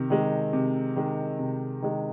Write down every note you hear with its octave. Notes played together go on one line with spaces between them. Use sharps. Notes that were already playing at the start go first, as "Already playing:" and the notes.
Already playing: C3 D#3
D#3 G#3
C3
D#3 G#3
C3
D#3 G#3